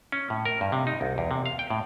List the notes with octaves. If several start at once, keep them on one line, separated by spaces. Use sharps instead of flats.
C#4
A2
A#4
G2
C3
D#4
C2
E2
C3
F5
G5
A2